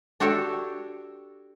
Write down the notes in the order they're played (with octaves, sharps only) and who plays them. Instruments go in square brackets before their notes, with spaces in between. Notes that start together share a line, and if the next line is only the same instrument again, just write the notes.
[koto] D4 F#4 G4 A4 C#5